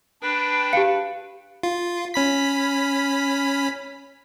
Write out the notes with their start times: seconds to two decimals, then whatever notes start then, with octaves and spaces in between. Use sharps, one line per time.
0.22 D4 B4 G5
0.73 G4 F5 C#7
1.63 F4
2.14 C#4 B5 B6